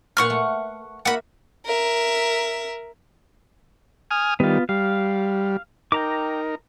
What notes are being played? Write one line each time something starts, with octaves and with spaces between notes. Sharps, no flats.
A#2 B4 F#5 C6 C#6 F6
A3
A#3 F#4 E5 F#5 B5
A#4 E5
G#5 D#6 F6
D#3 G3 B3 F4
G3 F5
D#4 A#4 G5 A#5 D6